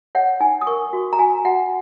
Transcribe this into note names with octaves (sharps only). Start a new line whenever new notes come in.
C#5 F#5
D#4 G#5
D#6
A#4 C#6
F#4
A#5
F#4 G#5
F#4 F#5